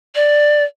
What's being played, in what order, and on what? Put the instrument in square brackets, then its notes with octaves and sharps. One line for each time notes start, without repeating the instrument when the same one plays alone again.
[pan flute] D5